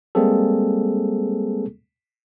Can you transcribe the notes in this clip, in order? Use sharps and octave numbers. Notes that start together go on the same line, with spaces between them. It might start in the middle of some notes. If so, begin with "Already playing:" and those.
G3 G#3 A#3 C4 G#4 A4